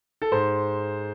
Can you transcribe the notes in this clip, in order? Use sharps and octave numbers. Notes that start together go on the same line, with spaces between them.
A4
G#2 C5